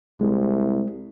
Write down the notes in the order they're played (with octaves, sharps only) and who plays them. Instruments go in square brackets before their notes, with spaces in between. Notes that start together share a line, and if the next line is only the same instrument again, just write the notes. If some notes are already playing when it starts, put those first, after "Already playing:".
[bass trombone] C2 [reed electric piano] G#3